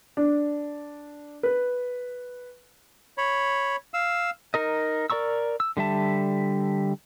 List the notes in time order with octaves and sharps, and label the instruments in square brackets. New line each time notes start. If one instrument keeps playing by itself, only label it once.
[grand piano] D4
B4
[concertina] C#5 B5
F5 E6
[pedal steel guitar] D#4 A#4 D#5
A#4 D5 A#5 C#6 E6
E6
D3 G3 E5 A5